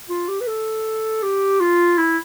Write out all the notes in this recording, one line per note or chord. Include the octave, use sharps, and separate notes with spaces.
F4
G4
B4
A4
G4
F4
E4